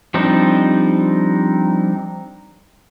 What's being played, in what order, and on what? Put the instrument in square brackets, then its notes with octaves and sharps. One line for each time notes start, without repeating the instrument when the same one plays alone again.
[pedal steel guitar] F3 G3 C4 D4 D#4